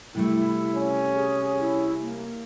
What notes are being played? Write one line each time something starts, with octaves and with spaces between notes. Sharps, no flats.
C3 G3 A3 E4
C#4
G#4
E4
A#3